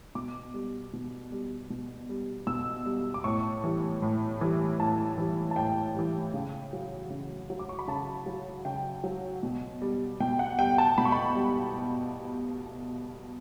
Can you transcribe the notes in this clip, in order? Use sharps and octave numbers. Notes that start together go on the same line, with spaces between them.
B2 D6
G3
B2
G3
B2
G3
B2 E6
G3
D6
A2 C#6
E3 G3
A2
E3 G3
A2 A5
E3 G3
A5
A2 G5
E3 G3
C#3
F#3
C#3
F#3
D6
C#6
B5
C#3 A5
F#3
C#3 G5
F#3
B2
G3
B2 G5
F#5
G3 G5
A5
B2 B5
C#6
B5
G3